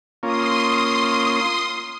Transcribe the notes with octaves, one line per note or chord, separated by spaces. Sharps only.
A#3 C#4 F4 C6 D#6